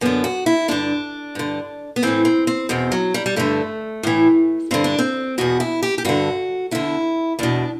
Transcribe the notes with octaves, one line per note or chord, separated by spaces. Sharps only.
F#2 D3 B3
F#4
E4
G2 D3 D4
G2 D3
B3
A2 E3 C4
C4
C4
E2 B2 C4
F#3
G3
G3
G2 D3 A3
A2 E3
G2 D3 C4
D4
C4
E2 B2 F#4
E4
G4
G4
G2 D3 F#4
E2 D3 E4
E2 B2 D4